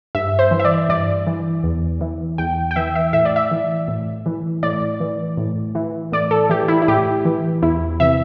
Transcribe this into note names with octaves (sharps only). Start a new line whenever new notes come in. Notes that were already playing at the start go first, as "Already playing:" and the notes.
G2 E5
C5
E3
E5
D5
G2 D5
E3
E2
E3
E2 G5
G5
E3 E5
E5
A2 E5
D5
E5
E3
A2
E3
A2 D5
E3
A2
E3
A2 D5
A4
E3 G4
E4
E4
A2 G4
E3
E2 E4
C3 E3 E5